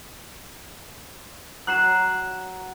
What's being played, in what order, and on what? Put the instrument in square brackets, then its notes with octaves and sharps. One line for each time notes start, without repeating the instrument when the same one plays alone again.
[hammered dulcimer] F#3 [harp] F#6 C7 E7